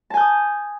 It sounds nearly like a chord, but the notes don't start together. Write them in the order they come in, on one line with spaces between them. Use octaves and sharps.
A5 G#5 G6 D#6